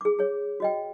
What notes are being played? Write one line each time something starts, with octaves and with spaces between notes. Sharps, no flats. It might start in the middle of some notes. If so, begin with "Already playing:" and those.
G#4 D6
G#4 C#5
F#4 D#5 G5